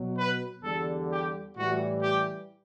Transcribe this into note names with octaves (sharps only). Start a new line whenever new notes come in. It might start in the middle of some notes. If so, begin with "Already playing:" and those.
Already playing: B2 F#3
B4
E2 D3 G3 A4
G4
A2 E3 G3 F#4
G4